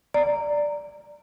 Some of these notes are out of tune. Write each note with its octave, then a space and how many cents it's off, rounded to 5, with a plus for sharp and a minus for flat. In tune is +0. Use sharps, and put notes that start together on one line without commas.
D5 +0 A#5 -15